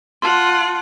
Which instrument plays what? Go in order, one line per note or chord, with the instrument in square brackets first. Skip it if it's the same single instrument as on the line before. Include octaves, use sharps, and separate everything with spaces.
[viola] F4 F#5 [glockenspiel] A5 C6